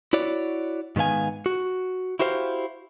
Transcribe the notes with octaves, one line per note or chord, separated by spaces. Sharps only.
E4 F#4 C#5 D5
G#2 D#3 B3 F5 G#5
F#4
E4 F#4 G4 C5 E5 F5